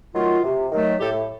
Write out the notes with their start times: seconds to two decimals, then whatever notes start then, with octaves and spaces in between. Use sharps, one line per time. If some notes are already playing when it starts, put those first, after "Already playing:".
0.14 D#3 F#3 A3 F4
0.44 C3
0.71 D#3 F#3 A3
1.00 A2 G4 A4